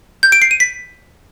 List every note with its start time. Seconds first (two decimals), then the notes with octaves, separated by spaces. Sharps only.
0.23 G6
0.32 D7
0.42 C7
0.51 D#7
0.60 B6